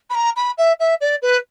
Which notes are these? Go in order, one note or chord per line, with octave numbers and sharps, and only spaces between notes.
B5
A#5
B5
E5
E5
D5
B4